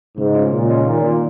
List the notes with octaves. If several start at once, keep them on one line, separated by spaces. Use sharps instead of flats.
G#2 C#3
G#3 C#4 F4
A#2 C#3
G#3 C#4 F4
A#2 D#3
A#3 F4